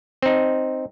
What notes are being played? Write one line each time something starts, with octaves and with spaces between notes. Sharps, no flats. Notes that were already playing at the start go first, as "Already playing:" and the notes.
C4 D#4